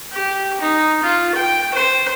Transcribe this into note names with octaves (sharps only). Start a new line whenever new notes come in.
G4
D#4
F4
G5
C5